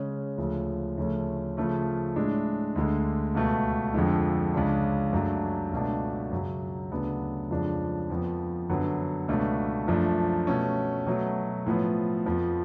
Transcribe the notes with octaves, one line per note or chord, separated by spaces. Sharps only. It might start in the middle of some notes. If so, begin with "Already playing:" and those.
Already playing: C#3 G#3 C#4
D2 C#3 F3
D2 C#3 F3 A3 C#4
C#3 F3 A3 C#4
A2 G#3 D4
D2 D3 G#3
C#2 B2 A3
F2 D3 F3 G#3
C#2 C#3 G#3 D4
F#2 C#3 F#3 A3 D4
C#2 B2 A3 D4
F#2 C#3 F#3
D2 C#3 F#3 B3 D4
F2 C#3 F3 G#3 D4
F2 F3 B3
F#2 D3 F#3 B3
C#2 B2 A3 D4
F#2 F3 A3 D4
B2 A3 C#4
B2 F#3 A3
A2 F3 B3
F2 F3 B3